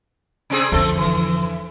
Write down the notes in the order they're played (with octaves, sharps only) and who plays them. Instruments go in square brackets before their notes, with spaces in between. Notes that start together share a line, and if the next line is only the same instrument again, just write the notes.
[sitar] C3 C4 G#4
[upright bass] F2 D3 [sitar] A3 C4 A4
[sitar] E3